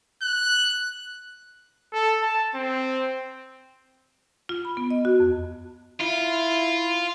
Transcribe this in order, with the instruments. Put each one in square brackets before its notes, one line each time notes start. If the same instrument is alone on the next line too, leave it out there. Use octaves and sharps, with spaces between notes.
[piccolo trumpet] F#6
[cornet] A4
A5
C4
[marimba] F4
B5
B3
D#5
F#4
F2
[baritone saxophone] E4 [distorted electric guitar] F4